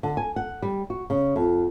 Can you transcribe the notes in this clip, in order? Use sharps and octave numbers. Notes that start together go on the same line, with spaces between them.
D3
G#5
F#5
G3
F#4
C#3
F2